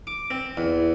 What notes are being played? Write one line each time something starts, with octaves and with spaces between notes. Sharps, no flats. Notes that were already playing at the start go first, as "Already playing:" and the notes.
D6
C4
E2